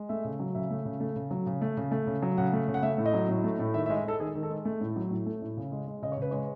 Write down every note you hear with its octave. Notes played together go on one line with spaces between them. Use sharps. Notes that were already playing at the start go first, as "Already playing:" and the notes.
Already playing: G#3
A3 E5
C#3
F#3
C#3 E5
A3
C#3
A3
C#3
F#3
C#3
A3
C#3
A3
C#3
F#3
C#3 F#5
A3
C#3
F#5
A3 E5
A2
D#5
F#3
A2
A3
A2
D#3 E5
E5
G#3
E5
G#3 A4
D#3 G#4
D#3
A4
G#3
A3
A2
F#3
A2
A3
A2
C#3
G#3
G#3
C#3 D#5
C#5
C#3 B4
G#3 C#5